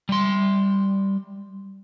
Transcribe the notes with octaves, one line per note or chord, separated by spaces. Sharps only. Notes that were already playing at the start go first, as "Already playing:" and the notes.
G3 C6